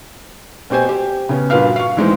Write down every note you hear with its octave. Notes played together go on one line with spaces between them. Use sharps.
B2 C4 G4 C5 G#5
G4
C#3 B3 C#4
G2 A#2 F#4 B4 F5 F6
F5 C#6
D#2 E3 G#3 C4 D#4